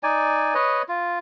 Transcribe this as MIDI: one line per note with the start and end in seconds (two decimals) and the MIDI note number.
0.03 0.54 63
0.03 0.54 74
0.03 0.54 80
0.54 0.82 71
0.54 0.82 73
0.54 0.82 75
0.88 1.19 65